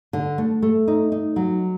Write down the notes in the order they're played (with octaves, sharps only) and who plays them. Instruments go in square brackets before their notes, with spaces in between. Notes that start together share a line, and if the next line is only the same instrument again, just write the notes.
[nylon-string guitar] D3
A3
A3
D#4
D#4
F#3